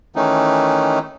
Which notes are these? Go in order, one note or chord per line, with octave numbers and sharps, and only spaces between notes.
D#3 E3 A3 C#4 D#4